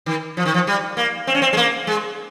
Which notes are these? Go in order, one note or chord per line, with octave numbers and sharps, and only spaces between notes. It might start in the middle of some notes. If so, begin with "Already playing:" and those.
D#3
F3
D#3
F3
G3
A#3
C4
C#4
C4
G#3
A#3
G#3